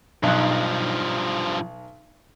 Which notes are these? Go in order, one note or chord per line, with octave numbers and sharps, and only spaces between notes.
B1 G2 F3 D#4 F#6